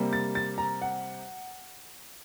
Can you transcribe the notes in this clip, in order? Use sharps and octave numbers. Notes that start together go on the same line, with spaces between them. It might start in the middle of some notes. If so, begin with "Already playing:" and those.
Already playing: C3 G3 A#3
A6
A6
A#5
F#5